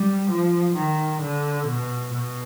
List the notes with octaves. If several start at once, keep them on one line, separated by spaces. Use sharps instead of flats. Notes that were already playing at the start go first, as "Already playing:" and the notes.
Already playing: G3
F3
D#3
D3
B2
B2